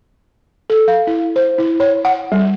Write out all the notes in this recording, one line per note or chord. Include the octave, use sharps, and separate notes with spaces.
A4
F5
E4
C5
E4
C#5
F#5
G3